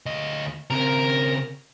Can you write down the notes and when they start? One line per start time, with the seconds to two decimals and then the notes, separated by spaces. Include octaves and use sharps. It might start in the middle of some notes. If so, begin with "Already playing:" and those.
0.06 D2 D#5
0.70 C#3 C4 A#4